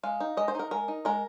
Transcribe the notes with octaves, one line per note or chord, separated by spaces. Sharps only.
G#3 F5
D#4
G#3 D#5
C5
D#4 A#4
G#3 A#4
D#4
G#3 A#4